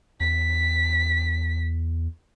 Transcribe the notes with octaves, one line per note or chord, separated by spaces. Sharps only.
E2 B6